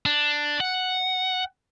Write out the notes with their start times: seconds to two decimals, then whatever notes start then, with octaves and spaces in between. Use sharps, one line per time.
0.06 D4
0.60 F#5